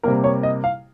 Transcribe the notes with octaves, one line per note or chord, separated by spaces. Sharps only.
C3 G3 A#3 A#4
C#5
D#5
F5